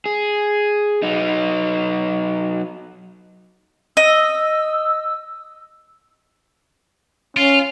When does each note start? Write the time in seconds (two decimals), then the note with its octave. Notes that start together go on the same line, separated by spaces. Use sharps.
0.06 G#4
1.03 F#3 D#4
3.97 D#5 E6
7.37 C#4 F4